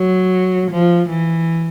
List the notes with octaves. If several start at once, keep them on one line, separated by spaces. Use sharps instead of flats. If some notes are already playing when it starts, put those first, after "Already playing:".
Already playing: F#3
F3
E3